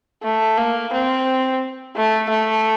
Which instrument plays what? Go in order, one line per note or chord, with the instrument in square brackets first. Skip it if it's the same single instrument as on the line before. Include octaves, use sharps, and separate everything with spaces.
[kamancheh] A3
A#3
C4
A3
A3